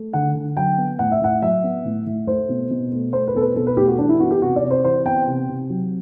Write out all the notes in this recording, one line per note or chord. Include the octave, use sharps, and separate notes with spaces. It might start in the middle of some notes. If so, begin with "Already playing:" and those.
Already playing: A3
D3 F#5
D3
F#3 G5
B3
A2 F#5
E5
A2 F#5
F#3 E5
B3
A2
A2
A3 C5
B2
B2
A3
A3 C5
B4
B2 A4
B4
B2 A4
B4
A3 G4
F#4
E3 D4
E4
B3 F#4
G4
C3 F#4
D5
C3
C5
E3 C5
B3 G5
C3
C3
F#3